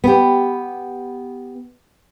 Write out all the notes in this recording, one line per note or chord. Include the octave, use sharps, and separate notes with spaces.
B3 G4